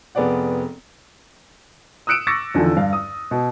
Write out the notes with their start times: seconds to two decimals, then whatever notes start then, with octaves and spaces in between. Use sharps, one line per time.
0.15 F1 B3 G#4 D5 F#5
2.07 D#6 E6 F#6 C#7 D7 E7
2.27 C#6 D6 E6 A6 A#6 C#7
2.54 E2 D3 D#3 F3
2.76 G2 F5
2.93 D#6
3.31 B2